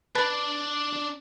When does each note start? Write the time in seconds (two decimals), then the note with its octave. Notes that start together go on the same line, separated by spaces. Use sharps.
0.15 D4 B4 D5 A5